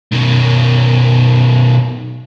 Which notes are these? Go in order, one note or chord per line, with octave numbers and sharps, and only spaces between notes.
B2 D#3